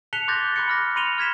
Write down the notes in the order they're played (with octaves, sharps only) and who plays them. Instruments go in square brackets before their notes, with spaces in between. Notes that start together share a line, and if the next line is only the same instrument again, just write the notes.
[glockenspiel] A5 F#6 B6 C#7 F7 G7
C6 D6 F#6 G6 A6 A#6
B5 D6 F#6 G6 C#7
B5 F6 A#6
B5 C6 C#7 D#7 F7 G7
F6 G#6 B6 E7